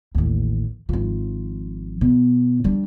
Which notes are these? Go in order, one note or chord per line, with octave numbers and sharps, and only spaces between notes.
A1 D#2
G#1 F3
B2
G3 D4